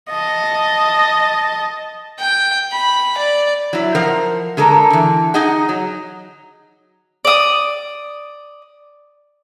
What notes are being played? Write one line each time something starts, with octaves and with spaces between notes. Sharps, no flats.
D#5 A5
G5
B5
D5
F#3 E4
F3 A#4 C5 F#5
D3 G#3 A4 A#4
D3 E3
D#4 G#4 D#5 F#5
F#3
D5 D#6